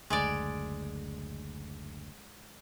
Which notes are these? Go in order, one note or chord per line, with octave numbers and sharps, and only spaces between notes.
F#1 D2 G#3 D5